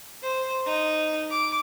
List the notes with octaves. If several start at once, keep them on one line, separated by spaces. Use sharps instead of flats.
C5
D#4
D6